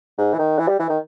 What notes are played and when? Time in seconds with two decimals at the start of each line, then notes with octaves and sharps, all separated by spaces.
0.18 G#2
0.34 E3
0.38 D#3
0.59 E3
0.68 G3
0.79 E3
0.89 D#3